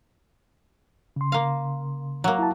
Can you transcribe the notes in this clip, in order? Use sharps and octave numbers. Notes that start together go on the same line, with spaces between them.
C#3 C6
A#3 F5
F#3 A#3 C#5 A#5
E4 A5